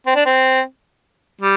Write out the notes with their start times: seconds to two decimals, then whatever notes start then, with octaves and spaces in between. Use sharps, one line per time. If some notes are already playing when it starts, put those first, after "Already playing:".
0.06 C4
0.15 D4
0.26 C4
1.41 G3